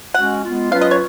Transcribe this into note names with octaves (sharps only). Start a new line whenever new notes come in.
G#3 C#4 F#4 F#5
G#3 B3 F4
F#3 C#4 F4 B4 F5
D#5
C#5